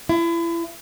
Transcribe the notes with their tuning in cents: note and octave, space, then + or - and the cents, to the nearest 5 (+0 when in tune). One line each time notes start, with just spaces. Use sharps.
E4 +35